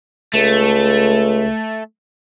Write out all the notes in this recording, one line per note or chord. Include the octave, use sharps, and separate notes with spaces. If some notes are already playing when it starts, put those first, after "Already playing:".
C#2 A3